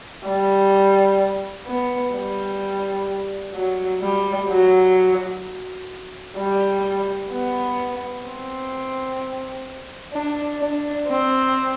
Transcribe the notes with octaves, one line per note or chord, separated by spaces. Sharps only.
G3
B3
G3
F#3
G3
F#3
G3
B3
C4
D4
D4
C4